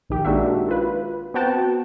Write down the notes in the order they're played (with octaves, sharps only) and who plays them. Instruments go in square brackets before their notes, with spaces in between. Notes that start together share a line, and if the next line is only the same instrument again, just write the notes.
[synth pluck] A#1 D#3 G4
G#3 A#3 D4 D#4 F#4 E5
F4 B4
B3 C4 F#4 F#5 G5 A5